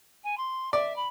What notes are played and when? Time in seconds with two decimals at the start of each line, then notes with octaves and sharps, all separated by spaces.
0.24 G#5
0.38 C6
0.73 D5 E5
0.96 B5